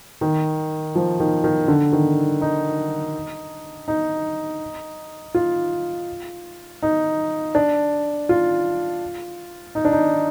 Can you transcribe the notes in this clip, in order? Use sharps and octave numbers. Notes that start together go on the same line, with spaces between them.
D#3
F3
D#3
D#3
D3
D#3
D#4
D#4
F4
D#4
D4
F4
D#4
D4
D#4